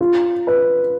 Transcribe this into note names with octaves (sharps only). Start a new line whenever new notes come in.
F4
B4